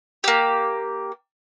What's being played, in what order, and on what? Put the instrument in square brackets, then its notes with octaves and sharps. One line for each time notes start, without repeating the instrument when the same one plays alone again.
[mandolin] A#3 G4